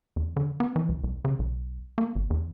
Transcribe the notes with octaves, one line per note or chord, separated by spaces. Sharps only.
E2
D3
B3
E3
C#2
C2
C#3
B1
A#3
G#1
E2